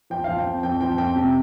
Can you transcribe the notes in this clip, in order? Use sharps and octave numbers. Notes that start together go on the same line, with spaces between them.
F3 G5
F3 F5
G5
F2
F2 G5
F3 G5
F2 G5
C3